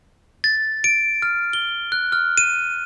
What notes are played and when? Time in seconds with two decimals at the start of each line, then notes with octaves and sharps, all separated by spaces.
0.44 A6
0.84 D7
1.22 F6
1.53 G7
1.92 F#6
2.12 F6
2.38 D#7